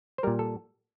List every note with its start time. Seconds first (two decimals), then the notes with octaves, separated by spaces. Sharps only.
0.18 C5
0.23 A#2 G3 A#4
0.39 A4